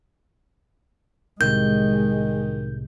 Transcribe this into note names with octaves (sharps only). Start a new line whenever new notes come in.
C2 A2 C3 D#3 G#3 G6